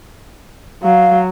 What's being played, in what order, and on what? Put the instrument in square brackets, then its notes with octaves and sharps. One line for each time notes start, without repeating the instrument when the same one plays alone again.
[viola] F#3 [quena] F5